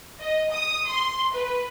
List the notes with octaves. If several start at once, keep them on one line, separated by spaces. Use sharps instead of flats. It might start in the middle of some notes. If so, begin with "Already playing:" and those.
D#5
D#6
C6
B4